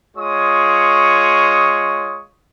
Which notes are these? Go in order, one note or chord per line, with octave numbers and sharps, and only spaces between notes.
G#3 F4 C#5 C#6 D#6